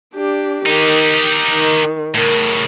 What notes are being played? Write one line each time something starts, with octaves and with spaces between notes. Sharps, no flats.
D4 G4
D#3 D#4 G4
D#3
A2 C#3 A#4